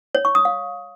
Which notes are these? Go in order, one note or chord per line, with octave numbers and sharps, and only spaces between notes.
C#5
C#6
D#6
F5